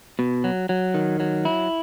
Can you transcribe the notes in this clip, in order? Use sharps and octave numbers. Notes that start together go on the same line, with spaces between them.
B2
F#3
F#3
D#3
F#3
E4